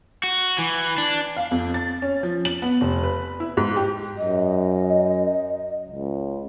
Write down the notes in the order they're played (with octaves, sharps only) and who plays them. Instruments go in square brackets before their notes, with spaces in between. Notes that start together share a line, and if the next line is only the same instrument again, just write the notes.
[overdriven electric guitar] F#4
E3
D4
[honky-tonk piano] F5
F2
A6
C#4
F3
F#7
B3
F1
B4
E4
G#2
G4
[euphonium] F#2 [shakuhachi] D#5
[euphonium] C#2